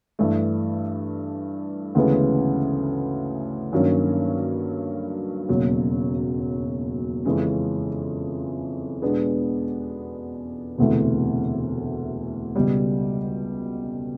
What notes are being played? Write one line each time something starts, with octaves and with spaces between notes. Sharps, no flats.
G2 E3 A3 D4
D2 C#3 E3 G#3 B3
G2 D#3 F#3 A#3 C#4
E1 D#2 C#3 F#3
F2 C#3 E3 G#3 C#4
E2 B2 G#3 B3 D4
E1 D2 C3 E3 A3
C#2 B2 G3